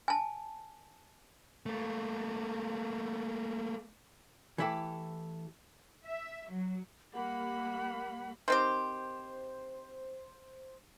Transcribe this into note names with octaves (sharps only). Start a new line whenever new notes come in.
G#5 A5
A3 A#3
E3 A3 E4 G4 A4
E5
F#3
G3 A#3 F#5 B5
D#3 C4 G4 C5